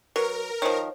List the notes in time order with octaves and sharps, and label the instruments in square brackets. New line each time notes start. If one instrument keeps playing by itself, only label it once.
[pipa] F#3 [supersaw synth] A#4 [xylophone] B4 A#5 C#7
[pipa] D#3 F3 [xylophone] C5 C#5